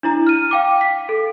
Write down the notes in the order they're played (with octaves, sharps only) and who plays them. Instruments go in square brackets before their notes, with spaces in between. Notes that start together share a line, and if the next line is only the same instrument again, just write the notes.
[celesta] D4 E4 A#5
F6 D#7
F5 G5 D6
B6
A4